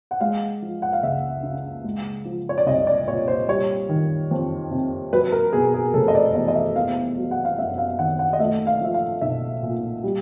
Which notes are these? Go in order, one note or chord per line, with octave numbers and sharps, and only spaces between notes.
F#5
G#3 F5
F3
F#5
F5
C#2 E5
C#3
G#3
F3
C#5
D5
C2 D#5
D5
A#2 C#5
C5
G3 C#5
D#3
F2
C3
F#3 B4
A#4
B2 G#4
G#4
F1 A4
D#5
D5
E2 D#5
D#5
E5
B3 F5
F#3
F#5
F5
F#2 E5
F5
D#3 F#5
F#5
D#5
A3 E5
F5
F3 E5
F5
B1 E5
A#2
G3